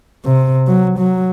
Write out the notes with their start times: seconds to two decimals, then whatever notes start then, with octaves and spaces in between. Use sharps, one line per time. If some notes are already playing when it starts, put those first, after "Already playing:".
0.25 C3
0.67 F#3
0.99 F#3